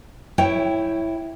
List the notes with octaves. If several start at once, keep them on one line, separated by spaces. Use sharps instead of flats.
E4 C#5 E5 G5